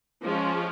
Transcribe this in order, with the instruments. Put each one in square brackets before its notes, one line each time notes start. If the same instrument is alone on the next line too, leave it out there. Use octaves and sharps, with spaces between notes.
[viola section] F3 G#3 C#4